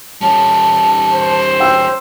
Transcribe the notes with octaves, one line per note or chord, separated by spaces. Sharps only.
G3 C#4 A5
C5
G5 E6